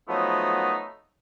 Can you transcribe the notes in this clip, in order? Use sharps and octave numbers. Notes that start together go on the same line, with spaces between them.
F3 F#3 A3 B3 D#4